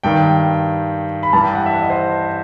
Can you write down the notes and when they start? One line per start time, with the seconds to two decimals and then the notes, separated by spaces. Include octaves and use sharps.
0.03 G2 D#3 G5
1.23 B5
1.33 G2 E3 A5
1.44 G5
1.55 F#5
1.66 E5
1.73 F#5
1.82 D#5
1.90 C5